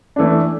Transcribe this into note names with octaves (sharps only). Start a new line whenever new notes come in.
E3 A3 D4